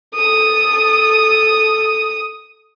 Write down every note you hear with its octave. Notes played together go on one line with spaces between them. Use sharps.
A4 D#6